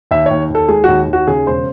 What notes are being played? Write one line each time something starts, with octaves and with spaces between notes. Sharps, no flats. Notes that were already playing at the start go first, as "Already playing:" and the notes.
D#2 E5
D#2 C#5
D#2
A4
G#3 G#4
D#2 F#4
D#2
F#4
C#3 G#4
E1 C5